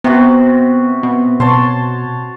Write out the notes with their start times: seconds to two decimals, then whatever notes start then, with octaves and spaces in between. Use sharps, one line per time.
0.04 C3 B3 F#4
1.03 B2
1.40 B2 C#5 A5 C6